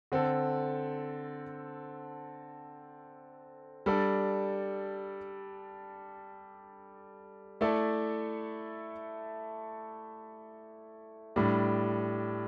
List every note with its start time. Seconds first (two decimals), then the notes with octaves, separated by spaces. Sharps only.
0.12 D3 C4 A4
3.86 G3 D4 A4 D5
7.61 A3 E4 A4 D5
11.36 A2 G3 D4